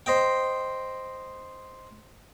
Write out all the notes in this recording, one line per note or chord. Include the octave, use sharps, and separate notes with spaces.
C5 D#5 G5